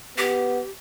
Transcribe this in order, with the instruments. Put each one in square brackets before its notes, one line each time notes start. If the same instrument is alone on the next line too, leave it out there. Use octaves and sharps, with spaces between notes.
[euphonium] B3 [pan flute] G4